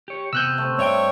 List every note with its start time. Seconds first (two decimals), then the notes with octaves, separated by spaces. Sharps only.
0.08 G4 C#5
0.33 C3 B3 E6 F#6 G6
0.58 A3 C4
0.79 G2 C#5 D5 E5 G5